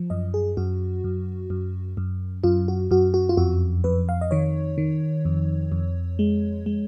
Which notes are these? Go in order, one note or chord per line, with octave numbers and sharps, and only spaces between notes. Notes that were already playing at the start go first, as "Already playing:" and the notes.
Already playing: F3
F#2 D#5
G#4
F#2 F#4
F#2
F#2
F#2
F#2 F4
F#4
F#2 F#4
F#4
F4
F2 F#4
F2 B4
F5
D#5
D#3 C#5
D#3
F2
F2
G#3
G#3